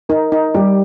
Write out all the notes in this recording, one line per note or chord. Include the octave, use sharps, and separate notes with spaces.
D#4 A#4
D#4
G3 G4